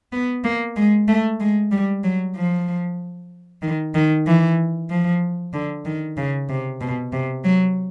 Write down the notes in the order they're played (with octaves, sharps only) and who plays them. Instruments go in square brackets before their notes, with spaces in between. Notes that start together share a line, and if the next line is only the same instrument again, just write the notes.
[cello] B3
A#3
G#3
A3
G#3
G3
F#3
F3
D#3
D#3
E3
F3
D3
D#3
C#3
C3
B2
C3
F#3